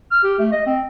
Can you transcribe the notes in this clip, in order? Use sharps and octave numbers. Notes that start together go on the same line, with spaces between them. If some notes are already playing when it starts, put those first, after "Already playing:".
F6
G4
A3
D#5
C4